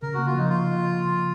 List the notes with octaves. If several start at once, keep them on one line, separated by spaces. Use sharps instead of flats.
C#3 A#4
A#3 F#4
F4
F3 D#4
F4